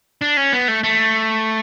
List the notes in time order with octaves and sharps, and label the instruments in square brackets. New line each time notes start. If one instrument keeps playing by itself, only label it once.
[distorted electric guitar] D4
C#4
B3
A3
A3